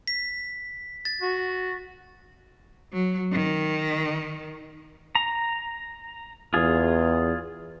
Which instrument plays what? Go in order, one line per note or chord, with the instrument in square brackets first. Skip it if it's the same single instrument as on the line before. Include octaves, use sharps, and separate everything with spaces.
[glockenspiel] B6
A6
[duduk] F#4
[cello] F#3
D#3
[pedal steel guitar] A#5
[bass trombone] E2 [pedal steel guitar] F4 G#4